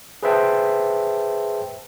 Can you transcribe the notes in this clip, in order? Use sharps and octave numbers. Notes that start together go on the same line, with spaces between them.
G#4 B4 C5 E5 G5 A5